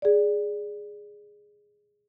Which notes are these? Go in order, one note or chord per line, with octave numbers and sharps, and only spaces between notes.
G#4 D5